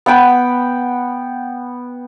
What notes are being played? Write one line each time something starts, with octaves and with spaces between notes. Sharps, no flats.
B3 F#5 G5 B5